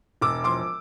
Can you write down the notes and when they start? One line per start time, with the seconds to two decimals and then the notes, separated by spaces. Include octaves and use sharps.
0.21 E1 D6 E6
0.44 F3 C6 D6